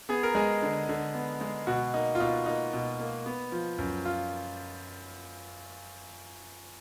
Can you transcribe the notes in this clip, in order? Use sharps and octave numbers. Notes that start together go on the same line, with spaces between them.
B3 G#4
A#4
G#3 G#4
D3
D3
B3
G#3
B2 F#4
A#3 D#4
F4
B2 D#4
A#3 D#4
B2
A#3
B3
F3
F#2
F4